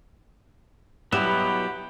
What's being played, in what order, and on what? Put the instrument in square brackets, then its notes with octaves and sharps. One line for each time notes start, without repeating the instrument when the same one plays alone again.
[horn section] B2 G4 F#5 [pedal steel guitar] F#3 B3 [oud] E4